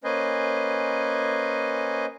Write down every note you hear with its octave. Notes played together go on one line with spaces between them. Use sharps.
A#3 C#4 B4 C5 D#5 G#5